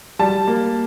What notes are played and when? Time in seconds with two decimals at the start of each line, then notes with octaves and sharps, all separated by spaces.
0.19 G3 A5
0.48 A#3